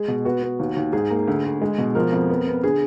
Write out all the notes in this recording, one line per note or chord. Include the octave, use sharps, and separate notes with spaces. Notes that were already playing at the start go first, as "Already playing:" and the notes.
Already playing: G#3 G#4
B2
B3 F#4
B3
D#2
D#2
G#2 G#4
A#3
D2
D2
G#3
B2
F3 A#4
F2
B3
B3
D3 G#4